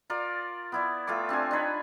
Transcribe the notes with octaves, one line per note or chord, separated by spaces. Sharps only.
F4 A#4 D5
B3 E4 D5
A3 F4 G5 D6
C4 D4 G4 G#5
D4 D#4 B4 C#5